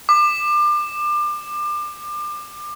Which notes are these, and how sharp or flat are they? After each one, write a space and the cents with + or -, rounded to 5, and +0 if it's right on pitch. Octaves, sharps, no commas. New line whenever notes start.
D6 +30